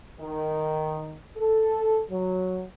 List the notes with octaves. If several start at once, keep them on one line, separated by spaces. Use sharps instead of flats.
D#3
A4
F#3